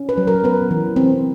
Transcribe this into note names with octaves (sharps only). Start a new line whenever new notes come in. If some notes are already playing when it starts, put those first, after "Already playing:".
Already playing: C#4
B4
F#3
A#4
B3 B4
E3
C4